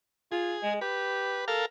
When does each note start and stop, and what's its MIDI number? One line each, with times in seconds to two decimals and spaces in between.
0.32 0.56 65
0.32 0.74 68
0.63 0.80 56
0.81 1.54 67
0.81 1.45 71
1.48 1.66 69
1.48 1.66 70
1.48 1.66 77